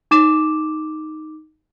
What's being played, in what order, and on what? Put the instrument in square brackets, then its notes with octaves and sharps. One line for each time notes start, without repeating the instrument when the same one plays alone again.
[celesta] D#4 D6 E7